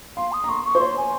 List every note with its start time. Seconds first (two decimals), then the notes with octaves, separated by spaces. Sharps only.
0.17 F5 C6
0.32 D#6
0.44 A#5
0.49 C6 C#6
0.65 C#6
0.75 C5
0.81 C#5 C6
0.97 G#5